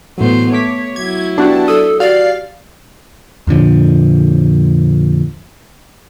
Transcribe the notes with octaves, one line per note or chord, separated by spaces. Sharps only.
A2 E3 F#3 A3 B3 C5
A3 C#5 D6 B6
F#3 E4 G#6
B3 D4 F#4 G4
A4 D#6 E6
F#4 G4 D5 F5
F2 A#2 D3 F3